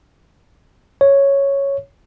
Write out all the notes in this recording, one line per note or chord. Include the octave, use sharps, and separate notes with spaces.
C#5